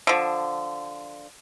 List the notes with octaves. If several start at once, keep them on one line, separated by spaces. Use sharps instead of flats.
D3 F3